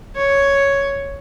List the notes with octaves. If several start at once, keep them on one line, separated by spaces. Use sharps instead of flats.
C#5